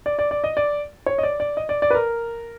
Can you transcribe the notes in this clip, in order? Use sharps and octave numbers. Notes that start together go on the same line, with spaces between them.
D5
D5
D5
D#5
D5
C#5
D#5
D5
D5
D#5
D5
D5
B4
A#4